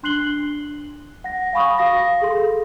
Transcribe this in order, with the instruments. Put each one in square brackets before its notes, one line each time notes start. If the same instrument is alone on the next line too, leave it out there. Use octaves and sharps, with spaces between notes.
[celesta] D4 C6 F#6 C7 F#7 G7
F#5 A#6
F5 G#5 B5 C#6 D#6
F#4 F5 D#6 A#6
G#4 A4 C6